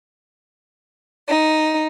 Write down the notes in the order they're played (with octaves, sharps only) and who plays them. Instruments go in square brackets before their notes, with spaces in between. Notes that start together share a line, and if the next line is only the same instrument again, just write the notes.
[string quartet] D#4